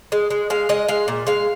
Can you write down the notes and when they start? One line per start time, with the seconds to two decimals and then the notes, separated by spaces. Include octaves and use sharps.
0.12 G#3
0.30 G#3
0.50 G#3 F5
0.69 G#3 D#5
0.88 G#3 F5
1.08 A#2
1.27 G#3 F5